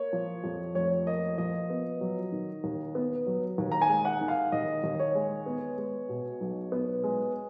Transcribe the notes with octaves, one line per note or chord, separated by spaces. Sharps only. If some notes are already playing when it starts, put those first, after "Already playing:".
Already playing: A#3 C#5
F3
F2
F1 C#5
A#3 D#5
F3 D#5
B3
F#3
D#3
D#2
B3
F#3
D#2
A#5
G#5
G#3
F#5
D#3
F5
D#2 D#5
D#2
C#5
G#3
B3
G#3
B2
B1
B3
G#3